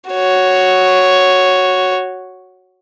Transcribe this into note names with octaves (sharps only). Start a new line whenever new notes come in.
F#4 C#5